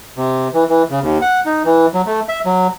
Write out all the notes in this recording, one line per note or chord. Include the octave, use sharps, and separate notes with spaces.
C3
E3
E3
C#3
D#2
F#5
D#4
E3
F#3
A3
E5
F#3